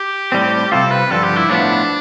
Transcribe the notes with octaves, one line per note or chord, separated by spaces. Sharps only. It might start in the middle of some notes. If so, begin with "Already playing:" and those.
Already playing: G4
A2 G3 C4
C3 G3 C4 F4 A4
B4
G2 D3 F3 A4
G4
E4
A2 F3 B3 D4